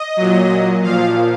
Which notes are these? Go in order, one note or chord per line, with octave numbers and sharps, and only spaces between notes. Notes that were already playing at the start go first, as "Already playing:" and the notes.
Already playing: D#5
A#2 F#3
A#2 F3 F5